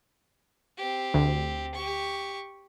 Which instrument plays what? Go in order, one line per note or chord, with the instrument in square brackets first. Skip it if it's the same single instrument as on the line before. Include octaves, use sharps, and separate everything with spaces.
[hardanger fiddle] C4 G4
[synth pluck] D2
[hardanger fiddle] G4 C#6